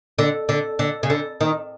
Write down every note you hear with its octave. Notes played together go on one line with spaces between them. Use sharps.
D3
D3
D3
C#3
D3
D#3